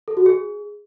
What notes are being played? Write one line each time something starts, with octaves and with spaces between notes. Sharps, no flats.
A4
F#4
G#4